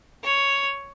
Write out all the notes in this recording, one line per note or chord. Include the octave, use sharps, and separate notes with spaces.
C#5